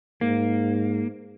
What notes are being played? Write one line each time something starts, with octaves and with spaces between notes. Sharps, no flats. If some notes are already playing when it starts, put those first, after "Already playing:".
G#2 A#3